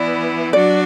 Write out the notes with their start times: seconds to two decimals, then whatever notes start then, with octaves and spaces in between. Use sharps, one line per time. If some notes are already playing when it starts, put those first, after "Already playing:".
Already playing: E3 B3 E4 D5
0.53 F#3 D4 F#4 D5